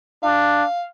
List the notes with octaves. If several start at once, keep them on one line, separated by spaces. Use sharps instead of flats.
D4 F5